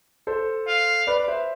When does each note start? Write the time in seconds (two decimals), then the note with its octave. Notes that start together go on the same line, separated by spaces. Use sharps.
0.27 A4 C5
0.68 F5
1.07 B4 D5
1.28 C5 E5